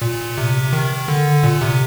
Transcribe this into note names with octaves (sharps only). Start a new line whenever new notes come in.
A#2
C3
D#3
D3
A#2
C3